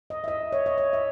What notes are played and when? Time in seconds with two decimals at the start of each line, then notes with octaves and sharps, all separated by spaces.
0.10 D#5
0.24 E5
0.28 D#5
0.52 C#5
0.66 D#5
0.78 C#5
0.93 E5